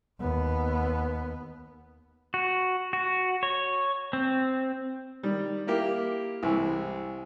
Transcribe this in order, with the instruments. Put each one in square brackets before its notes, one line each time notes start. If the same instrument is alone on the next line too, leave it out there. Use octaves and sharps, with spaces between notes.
[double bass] D#2 B3
[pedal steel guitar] F#4
F#4
C#5
C4
[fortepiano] D#3 G3
A#3 E4 G4 A#4
C2 E3 G#3